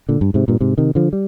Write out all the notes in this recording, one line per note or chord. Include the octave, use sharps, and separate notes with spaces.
A#2 D3
G2
G#2 C3
G2 A#2
G#2 C3
C3 D#3
D3 F3
G3